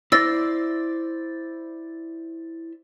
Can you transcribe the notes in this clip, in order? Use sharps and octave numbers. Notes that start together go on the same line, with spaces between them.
E4 C5 D5 E6 A6 A#6